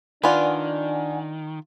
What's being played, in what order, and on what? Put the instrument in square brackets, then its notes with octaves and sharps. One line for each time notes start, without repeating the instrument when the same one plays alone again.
[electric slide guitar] D#3 [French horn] D4 [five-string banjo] F4 B4 [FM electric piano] D5 F#5 G#5